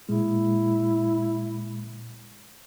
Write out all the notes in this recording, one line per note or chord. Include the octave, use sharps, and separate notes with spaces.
A#2 G#3 E4